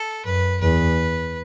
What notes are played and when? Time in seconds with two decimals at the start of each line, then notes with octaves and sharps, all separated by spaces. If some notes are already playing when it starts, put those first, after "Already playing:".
Already playing: A4
0.25 F#2 B4
0.61 E2 B4